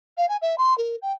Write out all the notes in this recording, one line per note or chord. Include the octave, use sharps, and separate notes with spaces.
F5
G#5
E5
C6
A#4
G5